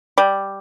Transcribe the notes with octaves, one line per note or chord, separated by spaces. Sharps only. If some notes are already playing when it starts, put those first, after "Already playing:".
G3